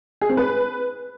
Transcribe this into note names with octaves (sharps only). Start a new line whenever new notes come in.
G#4
C4
B4